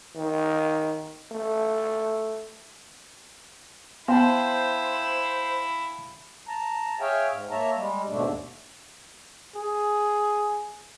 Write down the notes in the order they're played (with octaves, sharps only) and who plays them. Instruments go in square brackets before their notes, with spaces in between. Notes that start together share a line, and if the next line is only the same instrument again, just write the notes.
[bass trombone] D#3
A3
[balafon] B3 [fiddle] E4 [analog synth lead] C5 [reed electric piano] F5 G5 A5
[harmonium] A5 A#5
G#4 C#5 E5 F5 G5 G#5
G#2
A#3 C#5 E5 A5 A#5
G3 G#3
D#2 G#2 B2 A3 D4
[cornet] G#4